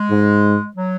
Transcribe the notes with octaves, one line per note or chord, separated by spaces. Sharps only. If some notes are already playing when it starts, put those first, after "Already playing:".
Already playing: G#3
G#2
F#3